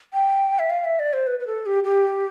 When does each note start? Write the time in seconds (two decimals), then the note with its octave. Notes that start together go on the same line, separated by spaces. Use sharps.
0.13 G5
0.59 E5
0.70 F5
0.84 E5
0.99 D5
1.13 C5
1.27 B4
1.40 B4
1.47 A4
1.66 G4
1.84 G4